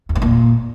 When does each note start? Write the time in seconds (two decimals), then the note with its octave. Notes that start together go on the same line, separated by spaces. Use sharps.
0.09 E2
0.15 G#2
0.22 A#2